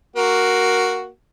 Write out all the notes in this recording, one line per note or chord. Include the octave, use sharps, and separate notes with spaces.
A#3 F#4